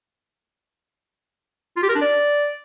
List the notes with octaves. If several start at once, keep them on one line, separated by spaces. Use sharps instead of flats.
F4
G4
A#4
D4
D5